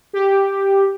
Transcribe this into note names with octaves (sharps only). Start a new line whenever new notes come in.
G4